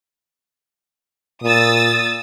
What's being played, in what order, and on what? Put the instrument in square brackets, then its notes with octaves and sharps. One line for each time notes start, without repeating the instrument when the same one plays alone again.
[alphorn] A#2 [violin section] D#6 E6 A6